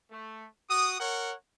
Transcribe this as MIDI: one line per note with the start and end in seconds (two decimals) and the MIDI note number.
0.11 0.47 57
0.69 0.95 66
0.69 0.95 87
1.00 1.33 70
1.00 1.33 73
1.00 1.33 78